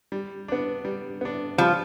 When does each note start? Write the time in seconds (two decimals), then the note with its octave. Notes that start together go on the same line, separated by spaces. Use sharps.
0.12 G3
0.48 B3 D4
0.85 G3
1.21 B3 D4
1.58 F3 G3